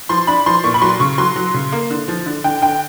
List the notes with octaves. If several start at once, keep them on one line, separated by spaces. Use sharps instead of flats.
F3 C6
D4 B5
F3 C6
A#2 C#6
B5
F#3 C6
C#3 C#6
F#3 C6
F#3
C#3
A#3
D3
F3
D3
D3 G5
D3 G5